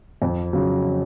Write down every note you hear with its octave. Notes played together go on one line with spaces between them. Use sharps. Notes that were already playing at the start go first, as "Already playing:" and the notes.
F2
C#3 F#3